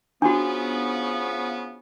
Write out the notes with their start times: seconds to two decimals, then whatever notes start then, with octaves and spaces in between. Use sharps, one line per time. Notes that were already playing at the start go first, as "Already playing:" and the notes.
0.22 C#3 F3 B3 D4 F#4